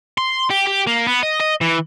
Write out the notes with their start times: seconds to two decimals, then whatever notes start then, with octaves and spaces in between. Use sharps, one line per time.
0.18 C6
0.51 G4
0.67 G4
0.87 A#3
1.07 B3
1.23 D#5
1.41 D#5
1.61 E3